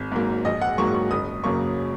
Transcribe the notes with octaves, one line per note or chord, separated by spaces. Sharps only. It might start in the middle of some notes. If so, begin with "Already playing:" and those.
Already playing: G#1
G#2 F#3 A#3
A#1 D#5
F#5
G#2 F#3 A#3 C#6
C#6
F#1 D#6
F#2 C#3 F#3 A#3 C#6